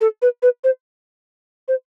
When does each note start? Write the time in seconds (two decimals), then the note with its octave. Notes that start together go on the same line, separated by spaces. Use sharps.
0.01 A4
0.22 B4
0.42 B4
0.64 C5
1.68 C5